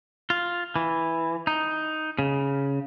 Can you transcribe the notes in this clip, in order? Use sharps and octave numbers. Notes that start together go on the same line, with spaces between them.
F4
E3
D#4
C#3